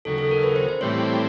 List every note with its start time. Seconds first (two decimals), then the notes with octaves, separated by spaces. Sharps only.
0.05 D#2 C#3 F#3 A4
0.18 A4
0.31 A#4
0.43 B4
0.56 C5
0.69 C5
0.81 A2 E3 G3 C4 C#5